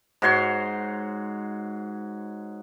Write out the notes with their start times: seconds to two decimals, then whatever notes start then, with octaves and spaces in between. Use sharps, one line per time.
0.22 G#2 F#4 C#5 C6